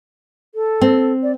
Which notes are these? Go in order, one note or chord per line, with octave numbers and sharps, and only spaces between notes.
A4
C4
D5